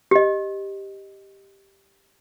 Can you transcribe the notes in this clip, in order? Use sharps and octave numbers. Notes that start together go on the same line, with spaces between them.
G4 D#5